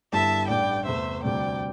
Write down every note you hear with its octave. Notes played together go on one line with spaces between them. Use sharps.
G1 G2 G3 E4 A4 E5 A5
A1 G2 G3 D5 G5
E2 C3 A3 C5 E5
D2 C3 G3 C4 D5 G5